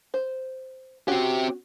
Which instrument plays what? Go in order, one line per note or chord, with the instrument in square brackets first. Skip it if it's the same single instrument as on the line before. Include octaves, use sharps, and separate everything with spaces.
[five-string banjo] C5
[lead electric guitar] C4 G4 [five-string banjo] C#4 F#4